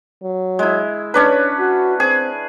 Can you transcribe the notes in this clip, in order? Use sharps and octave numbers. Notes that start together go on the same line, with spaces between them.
F#3
G#3 E4
C#4 D4 B4 C#5
F#4
C4 G#4